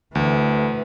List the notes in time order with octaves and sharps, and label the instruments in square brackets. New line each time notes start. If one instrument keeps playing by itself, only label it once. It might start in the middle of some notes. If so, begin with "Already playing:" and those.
[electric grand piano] D2 [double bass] E3